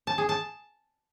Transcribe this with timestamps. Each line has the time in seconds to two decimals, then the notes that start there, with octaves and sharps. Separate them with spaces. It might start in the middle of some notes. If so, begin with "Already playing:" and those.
0.07 A5
0.18 G#4
0.29 A5